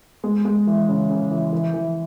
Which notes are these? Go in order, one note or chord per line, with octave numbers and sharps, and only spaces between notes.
G#3
G#3
E3
C#3
C#3
E3
E3
E3